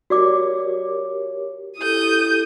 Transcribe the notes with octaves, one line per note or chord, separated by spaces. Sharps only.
F#4 G4 A#4 C#5 D5 D6
E4 G4 A4 D#6 G6